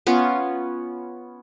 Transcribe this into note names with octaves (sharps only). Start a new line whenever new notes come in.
B3 C#4 F4